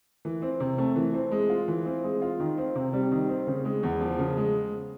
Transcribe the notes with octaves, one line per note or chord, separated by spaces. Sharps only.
E3
C4
C3
A3
E3
C4
G#3
F4
E3
C4
G#3
F4
D#3
C4
C3
G3
D#3
C4
C#3
G#3
E2
F3
C#3
G#3